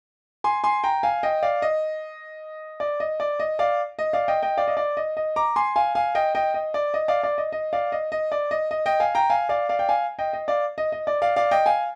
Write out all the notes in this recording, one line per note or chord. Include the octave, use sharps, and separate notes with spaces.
G#5 C6
G#5 C6
G5 A#5
F5 G#5
D#5 G5
D5 F5
D#5
D5
D#5
D5
D#5
D5 F5
D#5
D5 F5
D#5 G5
D#5 G5
D5 F5
D#5
D5
D#5
D#5
A#5 D6
G#5 C6
F5 G#5
F5 G#5
D#5 G5
D#5 G5
D#5
D5
D#5
D5 F5
D5
D#5
D#5
D5 F5
D#5
D#5
D5
D#5
D#5
D#5 G5
F5 G#5
G5 A#5
F5 G#5
D5 F5
D5 F5
G5
F5 G#5
D#5 G5
D#5
D5 F5
D#5
D#5
D5
D5 F5
D5 F5
D#5 G5
F5 G#5